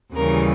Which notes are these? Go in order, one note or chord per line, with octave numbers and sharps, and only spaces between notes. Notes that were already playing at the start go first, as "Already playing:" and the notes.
D#2 C#3 E3 G3 A#4